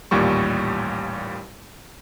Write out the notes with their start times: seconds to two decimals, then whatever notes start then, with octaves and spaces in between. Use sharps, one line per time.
0.11 A1 D#2 A#2 G3 C#6